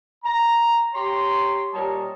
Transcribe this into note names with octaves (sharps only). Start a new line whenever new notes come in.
A#5
G4 C#5 A#5 C6
A#2 G3 C#5 D#5 A5 A#5